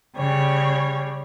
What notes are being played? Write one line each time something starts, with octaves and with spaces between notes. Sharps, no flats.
C#3 G3 C#5